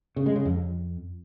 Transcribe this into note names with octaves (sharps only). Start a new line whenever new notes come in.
C#3
G#3
C#3
F2